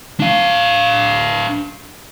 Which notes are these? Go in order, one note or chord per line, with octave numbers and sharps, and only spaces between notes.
D4 F5